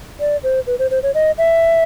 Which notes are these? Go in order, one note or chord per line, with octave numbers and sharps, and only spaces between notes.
D5
C5
B4
C5
C5
C#5
D#5
E5